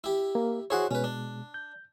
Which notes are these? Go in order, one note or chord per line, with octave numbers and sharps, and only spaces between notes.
E4 G4
A#3
E4 F#4 G#4 C5 C#5 F#5
B2 G#3 C#4 B4
D4
G6